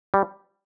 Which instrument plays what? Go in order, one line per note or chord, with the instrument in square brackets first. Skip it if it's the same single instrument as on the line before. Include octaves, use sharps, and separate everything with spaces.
[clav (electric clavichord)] G3